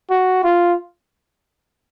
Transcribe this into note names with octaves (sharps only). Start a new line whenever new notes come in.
F#4
F4